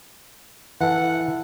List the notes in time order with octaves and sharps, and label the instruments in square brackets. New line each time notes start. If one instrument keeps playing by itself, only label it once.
[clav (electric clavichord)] E3 A4 [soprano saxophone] F#5